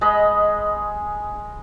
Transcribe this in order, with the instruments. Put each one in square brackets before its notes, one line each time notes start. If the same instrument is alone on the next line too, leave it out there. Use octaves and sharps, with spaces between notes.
[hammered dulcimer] G#3 D#5 B5